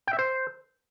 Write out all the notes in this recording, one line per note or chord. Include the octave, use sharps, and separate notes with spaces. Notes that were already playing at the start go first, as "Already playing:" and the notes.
G5
E5
C5